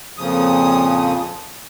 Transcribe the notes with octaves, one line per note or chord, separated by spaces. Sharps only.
F2 A#2 C#3 F3 D#6